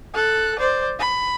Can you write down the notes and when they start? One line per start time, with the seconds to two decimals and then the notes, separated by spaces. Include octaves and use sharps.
0.14 A4 F#6
0.59 C5 D5
0.99 B5